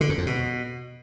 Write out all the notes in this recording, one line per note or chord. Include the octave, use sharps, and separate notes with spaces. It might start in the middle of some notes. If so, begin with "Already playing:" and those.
D3
F#2
F2
B2